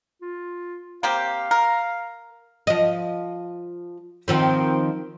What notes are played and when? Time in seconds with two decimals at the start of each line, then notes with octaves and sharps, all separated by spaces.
0.22 F4
1.03 A#3 C4 G4 F5
1.51 A#4
2.67 F3 D#5
4.28 D#3 F3 C4